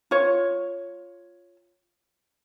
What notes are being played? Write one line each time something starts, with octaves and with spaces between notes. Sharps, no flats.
F4 C#5